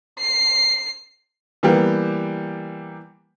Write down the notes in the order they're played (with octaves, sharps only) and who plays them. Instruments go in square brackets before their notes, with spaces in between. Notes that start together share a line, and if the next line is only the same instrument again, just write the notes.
[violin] C7
[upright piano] E3 G3 A#3 B3 G4